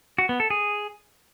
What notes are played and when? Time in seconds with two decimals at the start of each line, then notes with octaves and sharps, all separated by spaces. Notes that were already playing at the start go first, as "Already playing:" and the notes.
0.18 F#4
0.29 B3
0.40 A4
0.50 G#4